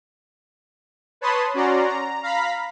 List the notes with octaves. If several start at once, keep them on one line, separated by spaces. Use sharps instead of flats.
B4 C#5 A5 B5 C6 D#6
C#4 F#4 D5 A#5 C6
A#5
F5 A#5 B5 B6